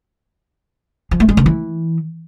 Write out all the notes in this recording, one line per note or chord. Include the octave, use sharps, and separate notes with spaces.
F3
A3
G#3
D3
E3